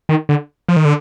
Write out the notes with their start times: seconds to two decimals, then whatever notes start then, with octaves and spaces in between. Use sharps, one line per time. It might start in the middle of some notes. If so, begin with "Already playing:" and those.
0.09 D#3
0.29 D3
0.68 F3
0.76 D#3
0.85 D3